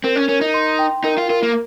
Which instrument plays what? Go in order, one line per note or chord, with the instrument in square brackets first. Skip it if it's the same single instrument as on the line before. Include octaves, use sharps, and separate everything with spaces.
[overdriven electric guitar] C4 [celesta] A#4
[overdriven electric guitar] C#4
[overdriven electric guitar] C#4 [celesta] A#4
[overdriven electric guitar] D#4
[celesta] C6
G5
[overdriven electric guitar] D#4 [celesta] A#4
[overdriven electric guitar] F4
[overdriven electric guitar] F4 [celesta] A#4
[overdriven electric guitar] A#3